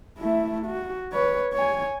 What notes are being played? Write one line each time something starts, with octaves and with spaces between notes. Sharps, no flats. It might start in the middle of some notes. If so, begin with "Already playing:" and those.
A3 E4
F#4
B4 C#5
C#5 G#5